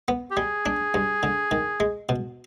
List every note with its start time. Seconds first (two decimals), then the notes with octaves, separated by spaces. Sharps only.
0.08 B3
0.31 G4
0.37 G3 G#4
0.66 D4
0.94 G2
1.23 D3
1.51 D#3
1.80 G#3
2.09 B2